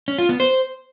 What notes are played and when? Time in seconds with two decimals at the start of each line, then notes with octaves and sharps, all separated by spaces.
0.08 C#4
0.18 F4
0.29 B3
0.40 C5